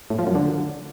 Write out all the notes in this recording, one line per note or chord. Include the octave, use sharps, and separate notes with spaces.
A2
F3
F#2
D3